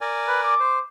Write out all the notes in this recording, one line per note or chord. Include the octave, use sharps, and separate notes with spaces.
A#4 D5 G#5
B4
D6
C5